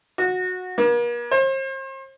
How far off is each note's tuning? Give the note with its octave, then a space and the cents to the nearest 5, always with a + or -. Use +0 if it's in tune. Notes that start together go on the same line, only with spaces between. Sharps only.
F#4 -15
A#3 +45
C5 +40